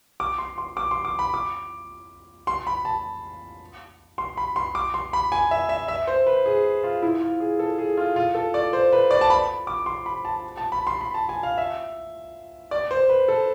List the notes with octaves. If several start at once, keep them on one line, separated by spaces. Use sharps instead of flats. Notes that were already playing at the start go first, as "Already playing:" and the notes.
D6
C6
C6
D6
C6
D6
B5
D6
C6
B5
A5
C6
B5
C6
D6
C6
B5
G#5
E5
E5
E5
C5
B4
G#4
F4
E4
F4
G#4
A4
G#4
F4
F4
A4
D5
C5
B4
D5
A5
B5
D6
C6
B5
A5
A5
B5
C6
B5
A5
G#5
F5
E5
D5
C5
B4
A4